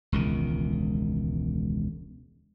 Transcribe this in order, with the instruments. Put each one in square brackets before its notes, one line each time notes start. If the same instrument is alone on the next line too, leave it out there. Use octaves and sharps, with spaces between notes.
[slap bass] E1 C#2 D#3